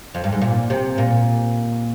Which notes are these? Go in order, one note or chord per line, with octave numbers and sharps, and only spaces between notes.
F2
G2
G#2
A#2
C3
A#2